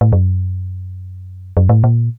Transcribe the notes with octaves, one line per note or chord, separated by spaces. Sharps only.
A2
F#2
F#2
A2
A#2